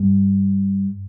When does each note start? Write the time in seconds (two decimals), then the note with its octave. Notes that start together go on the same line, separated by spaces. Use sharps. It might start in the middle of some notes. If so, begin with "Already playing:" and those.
Already playing: G2